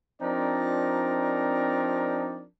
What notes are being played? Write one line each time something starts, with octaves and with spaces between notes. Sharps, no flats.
F3 C4 D4 D#4 A#4 D5